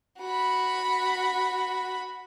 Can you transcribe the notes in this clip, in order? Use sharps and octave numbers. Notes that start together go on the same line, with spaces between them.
F#4 B5